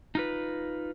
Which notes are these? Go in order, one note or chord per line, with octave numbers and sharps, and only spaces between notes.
D#4 F4 B4